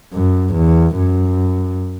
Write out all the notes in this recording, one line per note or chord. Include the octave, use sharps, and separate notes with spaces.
F#2
E2
F#2